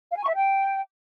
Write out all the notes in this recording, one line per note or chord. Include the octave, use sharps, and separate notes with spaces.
F5
G#5
C#6
E5
G5